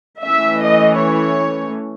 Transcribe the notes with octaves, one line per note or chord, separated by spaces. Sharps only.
E3 A3 C#4 E5
D#5
C#5